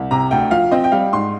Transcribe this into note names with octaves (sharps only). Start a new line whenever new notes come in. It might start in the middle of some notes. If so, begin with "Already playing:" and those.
Already playing: C2
C3 A#5
D2 G5
F3 F5
C4 D#5
G5
G3 F5
G#2 C6